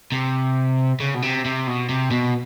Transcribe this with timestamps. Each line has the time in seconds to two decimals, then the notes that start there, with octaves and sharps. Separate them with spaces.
0.12 C3
1.00 C#3
1.14 B2
1.22 C3
1.45 C3
1.67 B2
1.89 C3
2.11 B2